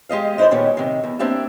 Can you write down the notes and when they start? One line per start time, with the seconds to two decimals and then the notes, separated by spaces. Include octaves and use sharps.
0.09 G#3 G4 D#5 F5
0.38 G#3 D#4 E4 C5 D5
0.51 A#2 D#3 G3 B3 C#4
0.77 C3 D#3
1.04 E2
1.19 A#3 C4 D4 G4 E5